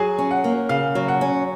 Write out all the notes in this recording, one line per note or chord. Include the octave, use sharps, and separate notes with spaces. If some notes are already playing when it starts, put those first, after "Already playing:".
Already playing: F#3 G#4 G#5
C#4
F#5
A#3
C#3 F5
F#3
F#5
C#4